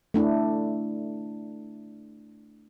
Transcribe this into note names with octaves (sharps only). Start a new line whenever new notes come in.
A3 D4 E4